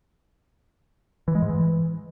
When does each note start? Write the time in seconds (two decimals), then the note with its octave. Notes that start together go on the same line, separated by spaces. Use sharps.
1.28 E3
1.35 G#3
1.42 G#2
1.49 E3